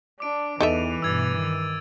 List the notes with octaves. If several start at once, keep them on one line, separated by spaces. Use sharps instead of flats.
D4 D6 D7
E2 E3 D#4 A4 E5 D7 D#7 F7
G2 B2 E6 G#6 A6
D#3